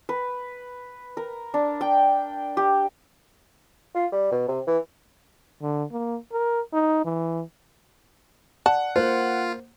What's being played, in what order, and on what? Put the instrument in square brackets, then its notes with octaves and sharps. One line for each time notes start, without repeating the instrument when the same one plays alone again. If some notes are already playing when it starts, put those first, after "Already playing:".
[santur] B4
A#4
D4
G5
G4
[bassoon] F4
G3
B2
C3
E3
[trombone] D3
A#3
A#4
D#4
E3
[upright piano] D5 [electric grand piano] F#5 [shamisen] A5
[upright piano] A#3 C5 [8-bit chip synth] F4